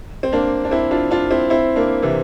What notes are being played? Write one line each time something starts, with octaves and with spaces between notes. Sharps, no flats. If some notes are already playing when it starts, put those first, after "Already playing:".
C4
A#3 D4
D4
C4 E4
D4 F4
D4 F4
C4 E4
C4 E4
A#3 D4
C3 E3